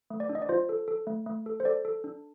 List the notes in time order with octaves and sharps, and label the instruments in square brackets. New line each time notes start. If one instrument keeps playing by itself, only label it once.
[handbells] A3
D5
D4
D#5
D5
F4 C5
A4
A4
A3
A3
A4
C5
A4 D5
A4
D4